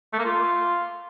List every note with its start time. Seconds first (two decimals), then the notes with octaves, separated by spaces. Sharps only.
0.13 A3
0.19 A#3
0.25 F4